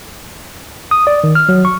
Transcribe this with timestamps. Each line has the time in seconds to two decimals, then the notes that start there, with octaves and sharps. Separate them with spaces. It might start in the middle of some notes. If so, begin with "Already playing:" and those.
0.91 D#6
1.07 D5
1.24 D#3
1.35 F6
1.49 F#3
1.65 C#6